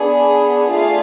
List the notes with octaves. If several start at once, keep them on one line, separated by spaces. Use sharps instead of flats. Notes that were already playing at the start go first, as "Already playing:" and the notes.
Already playing: B3 D4 G#4
A3 F4 G#4 D5 F5